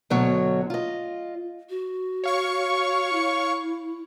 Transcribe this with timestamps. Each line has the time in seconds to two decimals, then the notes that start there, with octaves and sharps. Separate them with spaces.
0.10 D2 B2 F#3 C#5
0.70 F4 D#5
1.70 F#4
2.24 C#5 F5 C#6
3.13 E4